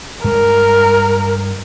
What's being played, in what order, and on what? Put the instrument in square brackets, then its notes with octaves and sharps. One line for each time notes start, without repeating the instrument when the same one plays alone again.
[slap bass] G2 G#3 [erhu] A#4